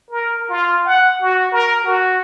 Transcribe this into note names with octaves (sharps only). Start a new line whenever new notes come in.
A#4
F4
F#5
F#4
A#4
F#4